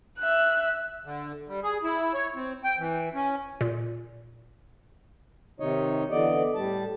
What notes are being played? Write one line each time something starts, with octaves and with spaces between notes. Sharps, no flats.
E5 F#6
D3
G3
G#4
E4
C#5
C4
G5
E3
C#4
A#2
C3 D#3 D#4 C#5 D#5
D3 E3 B3 D5 D#5
A2 G3 A5